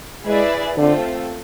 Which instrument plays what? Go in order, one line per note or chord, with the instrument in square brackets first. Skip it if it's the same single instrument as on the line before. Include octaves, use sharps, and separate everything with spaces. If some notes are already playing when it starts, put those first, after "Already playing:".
[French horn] G#3 [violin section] E4 G#4 B4 D5
[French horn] D3 [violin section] A3 C4 F4 A4